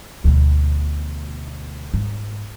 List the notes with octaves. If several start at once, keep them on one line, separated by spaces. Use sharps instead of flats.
D2 B2
G#2